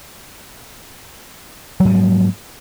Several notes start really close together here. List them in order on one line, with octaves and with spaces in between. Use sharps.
F#3 G#2 F3 A#3